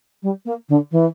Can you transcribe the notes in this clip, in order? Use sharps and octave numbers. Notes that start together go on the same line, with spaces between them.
G3
A#3
D3
E3